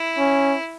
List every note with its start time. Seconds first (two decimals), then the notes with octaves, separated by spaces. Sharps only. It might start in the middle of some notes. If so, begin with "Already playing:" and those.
Already playing: E4
0.18 C#4